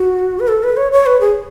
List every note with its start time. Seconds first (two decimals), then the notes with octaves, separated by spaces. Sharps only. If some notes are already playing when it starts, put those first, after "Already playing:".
Already playing: F#4
0.40 B4
0.48 A4
0.63 B4
0.77 C#5
0.92 C#5
1.06 B4
1.20 G#4